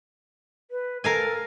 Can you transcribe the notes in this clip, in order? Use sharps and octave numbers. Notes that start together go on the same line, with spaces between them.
B4
A4 A#4 F5 G#5